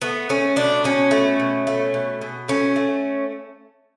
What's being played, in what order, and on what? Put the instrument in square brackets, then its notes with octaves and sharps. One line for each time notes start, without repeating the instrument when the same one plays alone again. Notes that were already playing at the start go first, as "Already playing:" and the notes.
[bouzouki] A3 B3
A3 C#4
B2 D4
B2 C#4
A3
B2
A3
B2
B2
A3 C#4
A3